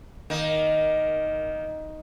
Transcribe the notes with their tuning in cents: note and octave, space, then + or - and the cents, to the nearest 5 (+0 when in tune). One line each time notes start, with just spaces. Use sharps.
D#3 +0 A#3 +15